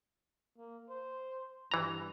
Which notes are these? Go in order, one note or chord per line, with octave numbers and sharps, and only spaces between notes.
A#3
C5
G2 E3 A#5